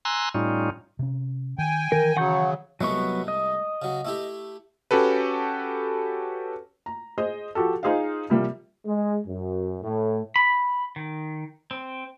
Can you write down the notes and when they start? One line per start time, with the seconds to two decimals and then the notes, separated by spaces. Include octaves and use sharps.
0.05 G#5 A#5 C6 E6 F#6
0.34 A2 G3 C#4 D#4 F4
0.99 C3 C#4
1.58 D#3 G5 G#5
1.92 D#3 E3 A#4
2.17 C#3 F#3 F#5 C#6 G6
2.81 C2 F#3 G#3 A3 B3 C#6
3.28 D#5
3.82 C#3 F#3
4.05 A3 E4 G4
4.91 C#4 F#4 G4 A4 B4
6.86 A#5
7.18 G#4 C5 D#5
7.55 F3 F#4 G4 A4
7.83 D#4 F4 G#4 C5 D#5 F5
8.30 C3 F3 G3 A#3
8.85 G#3
9.27 F#2
9.82 A2
10.36 B5
10.96 D#3
11.71 C4